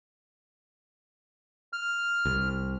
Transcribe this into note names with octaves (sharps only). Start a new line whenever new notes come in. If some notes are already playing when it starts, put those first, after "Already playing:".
F6
C2